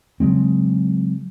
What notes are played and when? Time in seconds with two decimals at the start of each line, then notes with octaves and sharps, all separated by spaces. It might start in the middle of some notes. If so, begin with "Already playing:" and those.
0.20 C#3 F#3 G#3 C4